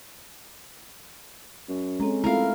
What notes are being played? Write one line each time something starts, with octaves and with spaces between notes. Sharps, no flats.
F#2
G#3 C4 C#4 A4 A#5
F1 G#3 A3 E4 F4 A4 A#4 F5